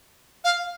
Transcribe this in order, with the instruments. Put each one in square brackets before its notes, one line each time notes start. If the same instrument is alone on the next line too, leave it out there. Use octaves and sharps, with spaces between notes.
[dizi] F5